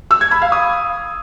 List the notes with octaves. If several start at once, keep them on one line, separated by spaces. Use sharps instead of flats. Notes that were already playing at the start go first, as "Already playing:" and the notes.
E6
G#6
B5
F5
D#6